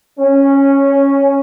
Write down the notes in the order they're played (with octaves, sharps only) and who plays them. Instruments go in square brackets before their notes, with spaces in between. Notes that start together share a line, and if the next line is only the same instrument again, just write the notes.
[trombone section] C#4